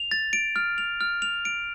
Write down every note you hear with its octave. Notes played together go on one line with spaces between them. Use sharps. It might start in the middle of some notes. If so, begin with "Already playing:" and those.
Already playing: F7
A6
D7
F6
F7
F6
F7
D7